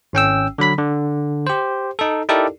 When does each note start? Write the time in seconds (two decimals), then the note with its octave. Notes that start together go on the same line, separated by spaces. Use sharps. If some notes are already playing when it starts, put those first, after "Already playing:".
0.13 G#1 C#4 G5 E6
0.58 D3 F#3 B5 B6
0.78 D3
1.47 G4 C5
1.99 D#4 A4
2.29 D#4 E4 G4 A4 A#4 D5